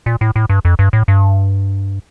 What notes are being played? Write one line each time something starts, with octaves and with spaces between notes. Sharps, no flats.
A#2
A2
A2
G2
F2
G2
A2
G2